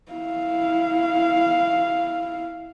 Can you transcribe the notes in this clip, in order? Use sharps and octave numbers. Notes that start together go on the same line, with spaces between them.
E4 F5